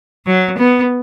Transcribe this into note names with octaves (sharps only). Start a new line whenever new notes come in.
F#3
B3